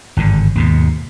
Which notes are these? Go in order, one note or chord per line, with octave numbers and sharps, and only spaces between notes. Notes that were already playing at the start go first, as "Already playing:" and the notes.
G#1 G2 D3
D#2 G#2 B2